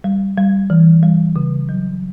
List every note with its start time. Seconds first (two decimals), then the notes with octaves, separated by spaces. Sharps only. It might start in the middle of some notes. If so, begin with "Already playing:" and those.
0.04 G3
0.37 G3
0.70 E3
1.03 G3
1.36 C#3
1.69 F#3